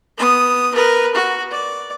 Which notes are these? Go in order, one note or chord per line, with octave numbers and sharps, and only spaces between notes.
B3 D#6
A#4 B4
F#4
D5